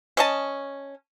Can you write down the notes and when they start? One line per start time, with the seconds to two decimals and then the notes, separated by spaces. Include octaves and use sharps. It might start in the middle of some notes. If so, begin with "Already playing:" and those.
0.17 C#4 D#5 A5